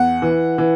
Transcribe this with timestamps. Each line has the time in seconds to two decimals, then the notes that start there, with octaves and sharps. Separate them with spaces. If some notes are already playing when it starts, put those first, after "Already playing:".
Already playing: E2 F#5
0.22 E3
0.58 E3